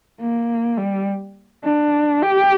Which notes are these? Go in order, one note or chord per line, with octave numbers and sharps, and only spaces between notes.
A#3
G3
D4
G4